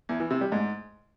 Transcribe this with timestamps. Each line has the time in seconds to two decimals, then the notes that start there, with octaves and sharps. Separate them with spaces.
0.09 E2
0.20 E3
0.30 C3
0.41 G3
0.52 G#2